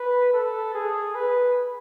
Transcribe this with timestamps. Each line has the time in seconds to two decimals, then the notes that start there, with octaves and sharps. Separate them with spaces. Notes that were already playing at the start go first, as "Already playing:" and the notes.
Already playing: B4
0.33 A4
0.75 G#4
1.15 B4